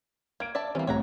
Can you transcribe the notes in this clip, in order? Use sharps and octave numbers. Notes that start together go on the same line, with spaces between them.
A#3 G#6 D7
D5 E5 A5
E3 G3 A#3 C4 C#4
C2 A2 C#5 F#5 A#5